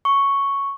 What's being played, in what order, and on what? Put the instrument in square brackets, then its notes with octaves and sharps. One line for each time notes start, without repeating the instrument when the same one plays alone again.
[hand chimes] C#6